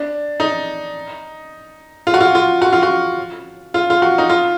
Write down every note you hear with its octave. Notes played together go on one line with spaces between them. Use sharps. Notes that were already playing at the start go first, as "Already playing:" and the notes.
Already playing: D4
D#4
F4
F#4
F4
F4
F#4
F4
F#4
F4
F4
F#4
D#4
F4